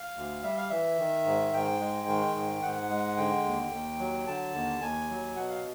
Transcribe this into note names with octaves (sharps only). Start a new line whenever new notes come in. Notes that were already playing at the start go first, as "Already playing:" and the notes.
Already playing: F5
D2
G3 E5
F5
E3 E5
D#3
G#2
G#2 G5
G#3
D#3
G#2
G#2 F#5
G#3
D3 G5
D#2
D#2
F#3
D3 A5
D#2
D#2 G#5
F#3
B2 F#5
F5